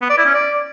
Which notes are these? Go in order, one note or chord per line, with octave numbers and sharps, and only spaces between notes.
B3
D5
E4
C#4
D5